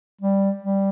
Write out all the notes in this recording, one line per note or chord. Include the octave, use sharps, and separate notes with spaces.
G3
G3